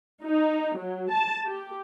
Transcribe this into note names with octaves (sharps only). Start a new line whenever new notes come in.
D#4
F#3
A5
G4